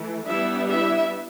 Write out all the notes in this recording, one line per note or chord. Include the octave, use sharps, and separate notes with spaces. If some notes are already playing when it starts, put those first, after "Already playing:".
Already playing: E3 A3
G3 B3 D4 E4 E5
E4 E5